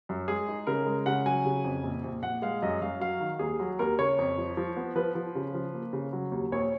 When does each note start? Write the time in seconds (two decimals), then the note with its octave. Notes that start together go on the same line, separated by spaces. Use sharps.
0.09 F#2
0.28 G#3 G#4
0.48 D#4
0.67 C#3 A#4
0.86 G#3
1.06 C#3 F#5
1.26 F#3 G#5
1.45 C#3
1.64 F2
1.83 A#1
2.04 A#1
2.22 A#1 F#5
2.42 G#3 F5
2.62 F#2 D#5
2.81 F#2 F5
3.00 F#3 F5
3.20 D#3
3.39 D#2 G#4
3.60 F#3
3.79 D#2 A#4
3.98 C#3 C#5
4.18 F2
4.38 F3
4.57 F3
4.77 B3
4.96 F3 B4
5.15 F3
5.35 C#3
5.54 F3
5.74 A#3
5.93 C#3
6.13 F#3
6.32 D#2
6.52 A#1 C#5